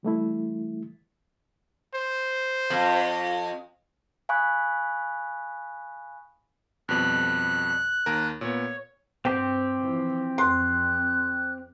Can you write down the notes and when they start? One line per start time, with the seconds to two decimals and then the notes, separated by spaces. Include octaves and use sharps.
0.03 E3 G3 A3 E4
1.94 C5
2.70 F2
4.29 F5 G#5 B5 C#6 D#6 F#6
6.89 F2 B2 G3 F#6
8.06 D#2 A#4
8.41 A#2 B3 C#5
9.25 G2 C4 G4 G5
9.80 E3 F3
10.38 F2 C6 F#6